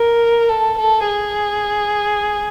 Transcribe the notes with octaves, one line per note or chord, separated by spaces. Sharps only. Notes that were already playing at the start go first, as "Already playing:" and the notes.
Already playing: A#4
A4
A4
G#4